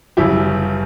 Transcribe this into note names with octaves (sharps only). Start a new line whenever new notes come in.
G1 F#2 C#3 E4 G4